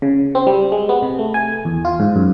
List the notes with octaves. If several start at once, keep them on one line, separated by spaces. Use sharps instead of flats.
C#3
C4
G3
G#3
B3
C3
A3
G#5
E2
F4
G#2
F#2